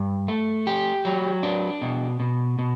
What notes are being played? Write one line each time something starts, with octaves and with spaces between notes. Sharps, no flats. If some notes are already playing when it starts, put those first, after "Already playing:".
Already playing: G2
A3
G4
F#3
D4
B2
B2
B2